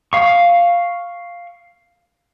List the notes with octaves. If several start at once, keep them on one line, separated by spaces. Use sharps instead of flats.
F5 C#6